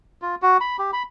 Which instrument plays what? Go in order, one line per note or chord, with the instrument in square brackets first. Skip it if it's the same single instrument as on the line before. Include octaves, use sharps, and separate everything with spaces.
[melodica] F4
F#4
B5
G4
B5